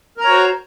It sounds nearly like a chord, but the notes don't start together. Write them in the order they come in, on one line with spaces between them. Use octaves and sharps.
A#4 A#5 C#5 F#4 C5